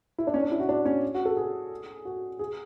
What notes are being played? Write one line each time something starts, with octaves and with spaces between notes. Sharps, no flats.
E4
D4
C#4
D4
E4
F#4
D4
C#4
F#4
A4
G#4
F#4
G#4